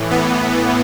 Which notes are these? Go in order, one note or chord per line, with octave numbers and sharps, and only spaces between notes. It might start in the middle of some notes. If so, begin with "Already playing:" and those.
Already playing: A2 E3
B3